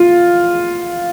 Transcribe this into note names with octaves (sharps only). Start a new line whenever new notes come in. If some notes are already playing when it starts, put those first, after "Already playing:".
Already playing: F4